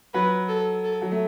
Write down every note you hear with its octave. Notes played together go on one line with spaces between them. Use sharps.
F#3 B4
A4
A4
F#3
A3